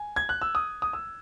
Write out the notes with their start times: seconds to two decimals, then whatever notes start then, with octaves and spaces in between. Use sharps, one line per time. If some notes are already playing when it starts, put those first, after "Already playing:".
Already playing: G#5
0.16 G#6
0.29 F#6
0.42 E6
0.55 D#6
0.82 D#6
0.93 E6